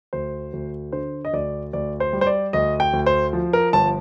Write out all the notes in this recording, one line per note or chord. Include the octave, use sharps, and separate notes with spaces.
D2 C5
D2
D3 C5
D#5
D2 D5
D2 D5
C5
G3
C5
D5
D2 D#5
G5
D2
C5
F3
A#4
G1 A5